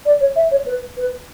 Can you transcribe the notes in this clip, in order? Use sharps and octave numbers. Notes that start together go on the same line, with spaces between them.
D5
C#5
E5
C#5
B4
B4